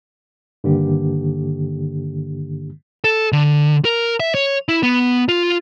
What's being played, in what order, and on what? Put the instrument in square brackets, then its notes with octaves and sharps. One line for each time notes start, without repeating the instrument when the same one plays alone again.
[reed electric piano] G2 D3 D#3 A#3 D4 G4
[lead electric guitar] A4
D3
A#4
E5
C#5
E4
B3
F4